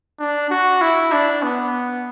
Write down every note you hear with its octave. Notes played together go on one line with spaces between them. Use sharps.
D4
F#4
E4
D4
B3